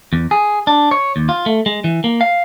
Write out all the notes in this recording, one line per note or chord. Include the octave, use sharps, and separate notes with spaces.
E2
G#4
D4
C#5
D#2
F4
A3
G#3
E3
A#3
F5